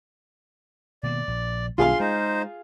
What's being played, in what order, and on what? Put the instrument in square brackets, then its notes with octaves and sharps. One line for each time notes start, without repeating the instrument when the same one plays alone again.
[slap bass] B2 D#3 A#3 [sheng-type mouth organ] D5
[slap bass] A#1
[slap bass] B1 D#3 [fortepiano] F4 G#4 F5 [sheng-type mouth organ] C6
[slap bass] G#3 [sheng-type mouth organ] D#4 C5